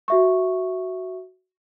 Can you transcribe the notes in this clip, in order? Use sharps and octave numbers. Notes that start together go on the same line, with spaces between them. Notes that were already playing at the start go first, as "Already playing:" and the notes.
F#4 E5 C#6